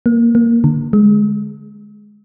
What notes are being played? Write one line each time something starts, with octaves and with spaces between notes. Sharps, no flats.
A#3
A#3
D3
G#3